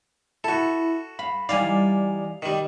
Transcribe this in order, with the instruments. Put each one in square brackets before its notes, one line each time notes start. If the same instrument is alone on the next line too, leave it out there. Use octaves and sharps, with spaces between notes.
[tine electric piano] E4 [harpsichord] F#4 A4
[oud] F5 [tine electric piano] B5
[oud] E3 G3 D#4 [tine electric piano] D5 G#5 [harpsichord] F5
[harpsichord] D#3 G3